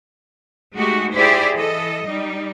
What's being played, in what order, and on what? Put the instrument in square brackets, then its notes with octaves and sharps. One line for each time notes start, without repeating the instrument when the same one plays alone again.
[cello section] G#3 A3 D#4 F#4 G4
E4 G4 G#4 C5 D5
E3 A4 D#5
G3 D#4